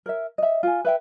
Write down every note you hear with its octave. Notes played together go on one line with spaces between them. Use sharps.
A#4 C#5 E5
D#5 E5
F4 G#5
B4 E5 G5